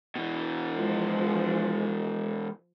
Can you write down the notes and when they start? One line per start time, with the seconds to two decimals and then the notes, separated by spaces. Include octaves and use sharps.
0.16 B2 E3
0.76 F3 G#3